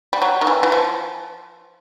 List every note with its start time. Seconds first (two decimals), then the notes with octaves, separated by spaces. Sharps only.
0.13 G3
0.22 F#3
0.41 D#3
0.47 E3
0.63 E3
0.72 F3